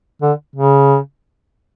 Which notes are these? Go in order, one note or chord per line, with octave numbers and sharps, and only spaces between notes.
D3
C#3